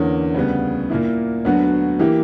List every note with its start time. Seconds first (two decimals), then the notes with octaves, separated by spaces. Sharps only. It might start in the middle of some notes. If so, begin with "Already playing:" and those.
Already playing: E2 D3 A#3 C#4
0.34 D2 C#3 G3 B3
0.90 A#2 A#3 E4
1.45 D2 D3 F#3 B3 F#4
1.99 E3 A#3 E4 G4